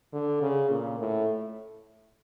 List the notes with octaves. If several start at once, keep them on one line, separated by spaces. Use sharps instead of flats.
D3
C#3
A#2
A2